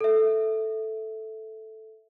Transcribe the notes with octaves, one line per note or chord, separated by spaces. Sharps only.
A4 E5